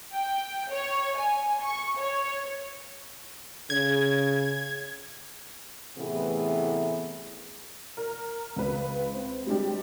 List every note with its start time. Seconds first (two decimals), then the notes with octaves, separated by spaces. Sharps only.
0.13 G5
0.70 C#5
1.16 G#5
1.61 C#6
1.98 C#5
3.70 C#3 G#6
5.98 A2 C3 E3 A3 B3 G#4
7.97 A#4
8.56 C#2 B4
9.13 C4
9.46 G3 G#3 D4 G4